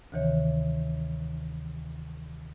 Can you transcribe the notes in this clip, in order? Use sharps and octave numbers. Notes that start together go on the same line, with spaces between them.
D2 C3 D#3 E3 C#5